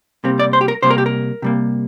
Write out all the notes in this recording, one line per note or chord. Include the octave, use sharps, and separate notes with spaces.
C3 G3 A#3 C4
D5
C5
G4
A#4
C3 G3 A#3 C5
A#4
G4
A#4
C3 G3 A#3